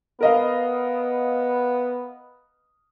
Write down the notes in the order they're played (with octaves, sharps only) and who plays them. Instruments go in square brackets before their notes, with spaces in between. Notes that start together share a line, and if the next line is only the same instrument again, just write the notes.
[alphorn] B3 [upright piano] A#4 D#5 F5